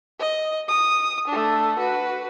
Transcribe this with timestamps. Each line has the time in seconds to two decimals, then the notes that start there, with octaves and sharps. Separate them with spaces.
0.20 D#5
0.68 D#6
1.28 A3 D4
1.79 F#4 B4